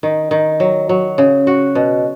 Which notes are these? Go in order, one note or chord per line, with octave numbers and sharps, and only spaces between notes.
D#3
D#3
F#3
F#3
C#3
F#4
B2